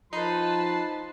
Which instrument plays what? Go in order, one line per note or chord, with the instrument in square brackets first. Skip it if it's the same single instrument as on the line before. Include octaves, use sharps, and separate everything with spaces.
[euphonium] F3 [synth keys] D#4 [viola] B4 A5 [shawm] C6